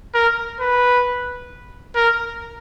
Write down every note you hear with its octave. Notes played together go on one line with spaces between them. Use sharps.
A#4
B4
A#4